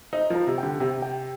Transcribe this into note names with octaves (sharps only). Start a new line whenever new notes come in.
D#4 C5
F3
A#5
C3
D3 G5
C3 G5
G5